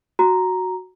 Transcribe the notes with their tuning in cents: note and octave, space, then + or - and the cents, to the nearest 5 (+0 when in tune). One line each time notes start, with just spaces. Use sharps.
F#4 +0 A#5 +0